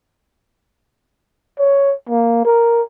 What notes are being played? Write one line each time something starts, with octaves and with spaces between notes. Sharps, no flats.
C#5
A#3
A#4